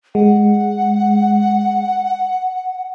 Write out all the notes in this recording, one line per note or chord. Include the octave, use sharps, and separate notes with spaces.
G#3 F#5